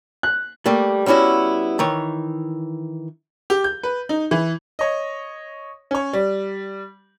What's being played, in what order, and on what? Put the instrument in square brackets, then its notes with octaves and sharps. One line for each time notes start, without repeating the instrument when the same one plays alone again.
[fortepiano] F#6
[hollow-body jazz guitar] G3 A3 A#3
G3 B3 C#4 E4 F#4
D#3 E3 C#5
[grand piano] G4
G6
B4
D#4
E3
C#5 D#5
C#4 C#5
G3